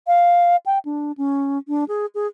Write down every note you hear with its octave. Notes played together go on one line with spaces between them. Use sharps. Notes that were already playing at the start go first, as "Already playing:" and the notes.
F5
G5
D4
C#4
D4
G#4
G#4